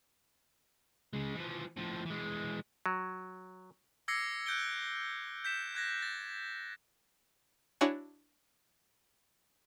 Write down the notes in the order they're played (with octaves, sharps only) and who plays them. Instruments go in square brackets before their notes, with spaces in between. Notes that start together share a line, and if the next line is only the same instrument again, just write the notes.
[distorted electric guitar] C#3 G#3
E3 F3
A2 F3
E3 G#3
[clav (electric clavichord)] F#3
[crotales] D6 E6 G#6 A#6 C7 C#7
F#6 G6 D7 G7
G6 B6 E7
F#6 G#6 A#6
A6
[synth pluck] D4 E4 F#4 C#5 F#5 G#5